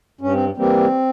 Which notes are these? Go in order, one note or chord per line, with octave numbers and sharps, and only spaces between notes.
G2 C#4
C4
E3 G3 A#3 C4